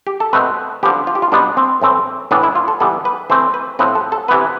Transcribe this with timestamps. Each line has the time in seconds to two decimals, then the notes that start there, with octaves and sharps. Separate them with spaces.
0.07 G4
0.20 A4
0.33 B2 A3 C4 B4
0.83 D3 F3 B3 G4
1.07 F4
1.15 G4
1.22 F4
1.32 B2 G3 B3 D4
1.57 C4
1.82 A2 E3 A3 C4
2.31 A2 E3 B3 D4
2.43 E4
2.55 F4
2.68 A4
2.80 E3 G3 B3 A4
3.05 B4
3.30 E3 A3 C4 C5
3.54 B4
3.79 A2 F3 C4 B4
3.95 A4
4.12 A4
4.28 C3 E3 B3 B4